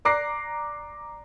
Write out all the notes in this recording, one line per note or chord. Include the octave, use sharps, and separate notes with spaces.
D5 A#5 D6 F#6 A#6 C7